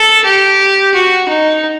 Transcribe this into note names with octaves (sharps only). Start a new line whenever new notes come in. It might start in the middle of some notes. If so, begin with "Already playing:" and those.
Already playing: A4
G4
F#4
D#4